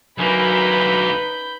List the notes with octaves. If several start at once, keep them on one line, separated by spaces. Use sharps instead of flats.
D2 F#3 A#3 D#4 B4 G#5 B5 G6